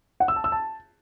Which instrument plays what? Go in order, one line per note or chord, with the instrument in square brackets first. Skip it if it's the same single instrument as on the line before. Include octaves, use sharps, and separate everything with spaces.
[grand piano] F#5
E6
A5
E6
A5